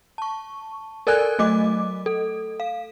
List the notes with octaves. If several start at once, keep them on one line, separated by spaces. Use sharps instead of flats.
A5 C#6
A4 A#4 D5 G#5 F#6 G#6
F#3 A3 D#5 D6
A4
F5